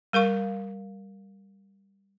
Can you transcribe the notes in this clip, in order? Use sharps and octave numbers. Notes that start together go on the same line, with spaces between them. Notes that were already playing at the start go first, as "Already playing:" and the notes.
G3 A#4 F5 C#6